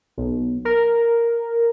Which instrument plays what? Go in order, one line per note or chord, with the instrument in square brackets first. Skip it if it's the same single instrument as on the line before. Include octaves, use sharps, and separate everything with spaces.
[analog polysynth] B1
A#4